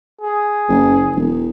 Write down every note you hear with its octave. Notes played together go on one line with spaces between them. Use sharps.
G#4
F#1
E1